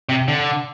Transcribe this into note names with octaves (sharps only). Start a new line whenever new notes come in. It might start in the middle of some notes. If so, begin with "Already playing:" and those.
C3
D3